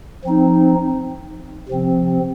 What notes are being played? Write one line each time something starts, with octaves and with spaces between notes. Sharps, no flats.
F3 C4 D#4
C3 F3 C4